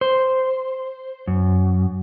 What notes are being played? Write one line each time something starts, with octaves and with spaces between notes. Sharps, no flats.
C5
F#2